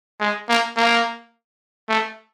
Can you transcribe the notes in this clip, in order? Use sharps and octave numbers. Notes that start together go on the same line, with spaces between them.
G#3
A#3
A#3
A3